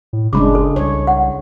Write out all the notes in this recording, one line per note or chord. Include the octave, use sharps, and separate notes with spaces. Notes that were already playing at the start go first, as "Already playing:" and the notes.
A2
F#1 C#3 G#3 D4 B5 D6
A4
C2 C#5
F#5